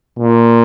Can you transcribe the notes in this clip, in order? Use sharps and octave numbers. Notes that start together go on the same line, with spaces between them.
A#2